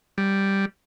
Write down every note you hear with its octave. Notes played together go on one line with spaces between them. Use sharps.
G3